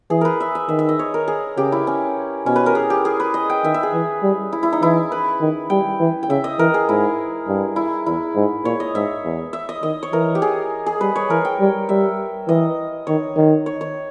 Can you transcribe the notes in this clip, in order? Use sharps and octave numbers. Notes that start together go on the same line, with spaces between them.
E3 G#4
A#4 B4
E5
E5
D#3 E5
E5
D#5
C#5
A#4
G#4
C#3 G4
E4
C#4
B2 C#4
B4
A#4
G#4
G4
G#4
B4
D#5
G5
D#3 E5
E5
G#4
E3
G3
E4
E4
D#4
E3 E4
B4
D#3
G3 G5
E3
G5
C#3 E5
D#5
E3 A#4
G#4
G#2 E4
G2
E4
E2 E4
G#2
A#2 C#5
D#5
G#2 E5
E2
E5
D#5
D#3 D#5
C#5
E3 A#4
G4
G#4
G#4
G3 B4
C#5
E3 A#4
G5
G3
G3 E5
E3 D#5
D#3 C#5
D#3
C#5
C#5